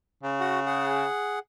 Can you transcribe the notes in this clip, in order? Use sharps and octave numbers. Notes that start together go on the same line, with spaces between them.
C#3
F#4 F#5
G#4 F#5